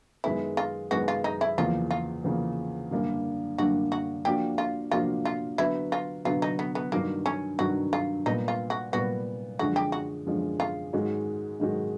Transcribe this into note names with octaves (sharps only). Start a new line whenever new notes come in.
F#2 D#3 G#3 B3 E4
F4
F#2 D#3 G#3 B3 F#4
F4
D#4
E4
E2 C#3 F3 A#3 F4
F4
E2 C#3 F3 A#3
F#2 D3 G3 A#3 D4
F#2 D3 G3 A#3 D4 F#4
F#4
F3 A#3 D4 F#4 G4
F4
F3 A#3 D4 F4 F#4
F4
D3 F#3 B3 E4
F4
D3 F#3 B3 F4
D#4
B3
B3
G2 D#3 F#3 A#3
C#4
G2 D#3 F#3 F#4
F4
A#2 G3 B3 D#4
F4
F#4
A#2 G3 B3 F#4
F#2 D3 F3 G#3 C#4 F#4
G4
F#4
F#2 D3 F3 G#3 C#4
F4
G#2 D#3 G#3 C#4 F#4
G#2 D#3 G#3 C#4 F#4